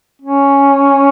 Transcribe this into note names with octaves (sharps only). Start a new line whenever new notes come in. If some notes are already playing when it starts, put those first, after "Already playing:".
C#4